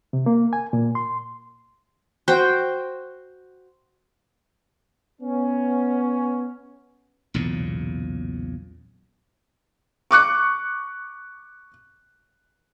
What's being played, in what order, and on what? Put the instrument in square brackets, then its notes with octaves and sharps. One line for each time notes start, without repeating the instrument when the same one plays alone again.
[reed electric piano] C3
A#3
G#5
A#2
C6
[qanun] F#4 C5 G5
[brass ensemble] B3 C#4
[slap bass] B1 E2 A#2 C#3
[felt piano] C#6 D6 F#6 C#7